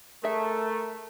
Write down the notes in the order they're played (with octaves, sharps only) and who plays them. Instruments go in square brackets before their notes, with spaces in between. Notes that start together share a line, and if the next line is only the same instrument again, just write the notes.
[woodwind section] A3 [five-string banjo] G#4 E5 [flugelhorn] A#4